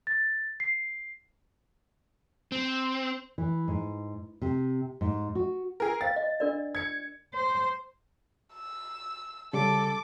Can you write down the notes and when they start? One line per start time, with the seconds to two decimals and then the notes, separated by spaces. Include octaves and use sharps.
0.07 A6
0.60 C7
2.52 C4
3.38 E3
3.68 G#2
4.42 C3
5.01 G#2
5.35 F#4
5.80 G#4 A#4
6.01 C5 F5 G5 A6
6.16 D#5
6.40 D4 A#4 D5
6.75 G#6 C#7
7.34 C5
8.54 E6
9.53 C#3 G3 A4 D6